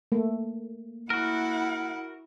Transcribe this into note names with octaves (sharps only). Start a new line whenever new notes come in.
A3 A#3
E4 F#4 A#4 F#5